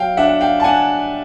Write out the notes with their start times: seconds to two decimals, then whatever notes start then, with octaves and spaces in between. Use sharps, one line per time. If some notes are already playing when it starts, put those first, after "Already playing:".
Already playing: F#3 F5 G5
0.17 D4 E5 F#5
0.29 F#5
0.41 F5 G5
0.60 A5
0.64 D4 F#5 G#5